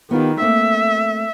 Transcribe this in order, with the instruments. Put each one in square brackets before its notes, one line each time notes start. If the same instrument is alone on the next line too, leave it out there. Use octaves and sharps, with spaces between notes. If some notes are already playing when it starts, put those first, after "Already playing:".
[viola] D#3 [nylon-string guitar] B3 F4 G4
[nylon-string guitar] A3 A#3 C4 [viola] E5